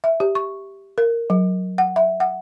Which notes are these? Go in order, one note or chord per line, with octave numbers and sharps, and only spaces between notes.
E5
G4
C#6
A#4
F#3
F#5
E5
F#5